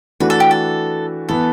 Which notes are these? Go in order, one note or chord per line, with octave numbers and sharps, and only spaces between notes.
E3 A3 D4 F#4 B4
A4
G4
A4
E3 B3 A4